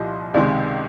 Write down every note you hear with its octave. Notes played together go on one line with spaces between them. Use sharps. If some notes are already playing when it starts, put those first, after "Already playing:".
Already playing: C2 A#2 F3 D#5
C#2 C3 D#3 G#3 D5